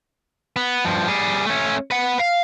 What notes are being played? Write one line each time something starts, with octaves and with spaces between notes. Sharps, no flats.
B3
G2 F3
G3 G#4
A3 C#4
B4 F#5
F5